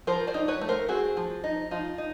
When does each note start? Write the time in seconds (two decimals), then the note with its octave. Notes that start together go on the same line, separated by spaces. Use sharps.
0.07 F3 A#4 C5
0.27 C5 D5
0.34 D#4
0.48 B4 C#5
0.61 A3
0.69 A#4 C5
0.89 C4 F#4 G#4
1.17 F3
1.44 D#4
1.71 F3 D#4 F4
1.98 D#4